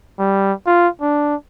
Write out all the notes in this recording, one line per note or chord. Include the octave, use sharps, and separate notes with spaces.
G3
F4
D4